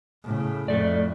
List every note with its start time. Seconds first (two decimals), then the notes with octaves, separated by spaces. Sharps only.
0.23 A2 C#3
0.68 F2 A2 A3 D5